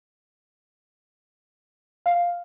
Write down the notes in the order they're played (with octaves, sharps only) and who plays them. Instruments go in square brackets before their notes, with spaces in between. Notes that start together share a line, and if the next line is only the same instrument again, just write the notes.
[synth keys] F5